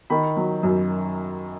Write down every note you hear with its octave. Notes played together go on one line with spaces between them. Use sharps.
D#3 B5
F#3
F#2